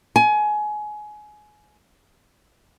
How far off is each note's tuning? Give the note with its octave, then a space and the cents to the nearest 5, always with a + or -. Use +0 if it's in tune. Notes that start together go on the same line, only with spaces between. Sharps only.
G#5 +25